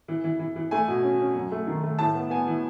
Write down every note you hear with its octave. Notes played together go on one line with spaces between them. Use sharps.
E3
E3
E3
E3
A3 G#5
B2
C#4
C#4
F#2
A3
D#3
A3
A2 A5
B3
B3 G#5
E3